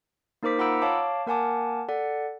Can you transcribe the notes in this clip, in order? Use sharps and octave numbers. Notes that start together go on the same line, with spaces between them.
A#3 D#4 A#4 C5 D6 B6
F4 F#5 A#5 B5 E6 D7
C#5 F5 A5 D6
A#3 A#4 F#5 G#5 A5 D6
A4 D5 F#5